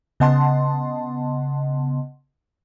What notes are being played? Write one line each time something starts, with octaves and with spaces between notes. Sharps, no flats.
C#3 B3 D#5 F#5 A5 C6